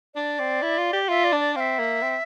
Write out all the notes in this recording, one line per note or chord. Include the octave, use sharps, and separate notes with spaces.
D4 D5
C4
E4
F4
G4
F4 E5
D5
D4
D5
C4 E5 F5
A#3
C4